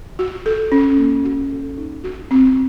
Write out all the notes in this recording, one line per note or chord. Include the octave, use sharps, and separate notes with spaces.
F#4
A4
C#4
A#3
F#4
A4
D#4
F#4
C4